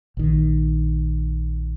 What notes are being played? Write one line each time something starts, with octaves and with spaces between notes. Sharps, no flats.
A#1 D#3